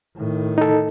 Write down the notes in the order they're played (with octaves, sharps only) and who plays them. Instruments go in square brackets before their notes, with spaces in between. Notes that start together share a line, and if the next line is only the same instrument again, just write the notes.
[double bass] A2 D#3
[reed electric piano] D#4 A4